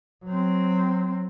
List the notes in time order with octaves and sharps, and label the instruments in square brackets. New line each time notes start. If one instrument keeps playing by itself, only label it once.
[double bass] F#3 C4